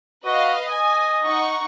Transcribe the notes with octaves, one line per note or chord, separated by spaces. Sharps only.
F#4 B4 D#5 F5
D#5 G#5
D#4 F#5 C#6